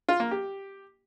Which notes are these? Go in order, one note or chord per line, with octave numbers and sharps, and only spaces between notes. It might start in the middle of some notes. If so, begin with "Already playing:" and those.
F4
A#3
G4